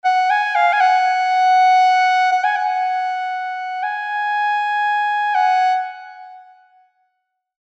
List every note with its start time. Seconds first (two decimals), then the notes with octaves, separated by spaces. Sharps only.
0.05 F#5
0.30 G#5
0.55 F5
0.73 G#5
0.81 F#5
2.32 F#5
2.44 G#5
2.56 F#5
3.83 G#5
5.35 F#5